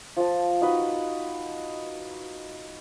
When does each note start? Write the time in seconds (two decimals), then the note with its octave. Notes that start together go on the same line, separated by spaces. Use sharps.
0.17 F3 A5
0.61 D#4 F#4 B4 D#5